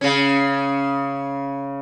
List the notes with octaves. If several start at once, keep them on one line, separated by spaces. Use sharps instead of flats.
C#3 C#4